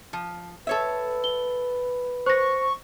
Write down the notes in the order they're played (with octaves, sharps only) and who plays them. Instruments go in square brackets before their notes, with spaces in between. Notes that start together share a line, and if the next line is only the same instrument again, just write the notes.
[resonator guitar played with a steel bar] F3
[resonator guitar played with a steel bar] A4 C#5 E5 [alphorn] B4
[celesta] G7
[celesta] C5 A#6 [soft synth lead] C#6